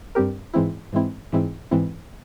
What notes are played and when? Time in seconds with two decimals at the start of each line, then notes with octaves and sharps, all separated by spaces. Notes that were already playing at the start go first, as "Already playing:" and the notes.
0.15 G2 G3 C4 G4 A#4
0.54 G#2 E3 G#3 C4 E4
0.92 G#2 E3 G#3 C4 E4
1.32 G#2 E3 G#3 C4 E4
1.71 G#2 E3 G#3 C4 E4